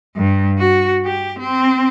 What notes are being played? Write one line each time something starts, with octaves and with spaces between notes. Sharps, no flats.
G2
F#4
G4
C4